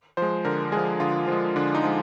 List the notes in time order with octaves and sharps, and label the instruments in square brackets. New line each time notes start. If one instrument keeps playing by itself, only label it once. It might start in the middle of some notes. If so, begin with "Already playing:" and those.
[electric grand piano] F3 G#3 C5
D3 A#4
G#3 G#4
F3
D3 F4
F3 G#3
D3 D4
D#4
F3 G#3